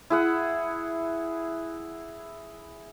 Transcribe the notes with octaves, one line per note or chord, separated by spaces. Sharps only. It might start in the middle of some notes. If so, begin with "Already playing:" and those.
E4 G#4 F#5